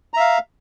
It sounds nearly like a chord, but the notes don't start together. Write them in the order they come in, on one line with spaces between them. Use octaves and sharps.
A#5 E5 F5